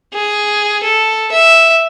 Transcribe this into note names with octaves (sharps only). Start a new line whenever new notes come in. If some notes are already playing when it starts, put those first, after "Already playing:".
G#4
A4
E5